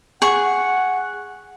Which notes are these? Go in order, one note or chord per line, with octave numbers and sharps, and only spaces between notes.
G#4 F#5 C#6